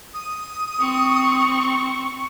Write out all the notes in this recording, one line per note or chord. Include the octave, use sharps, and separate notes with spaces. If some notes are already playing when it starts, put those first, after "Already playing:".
D#6
C4 C#6